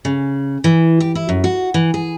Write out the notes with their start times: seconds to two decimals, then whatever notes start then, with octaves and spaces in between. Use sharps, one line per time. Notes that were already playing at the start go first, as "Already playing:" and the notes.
0.05 C#3
0.64 E3
1.00 G4
1.15 E4
1.29 F#2
1.44 F#4
1.74 E3
1.94 G#4